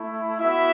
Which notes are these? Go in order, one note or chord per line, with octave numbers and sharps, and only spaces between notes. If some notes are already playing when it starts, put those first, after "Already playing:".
Already playing: A3 E4
B3 E4 F#4 E5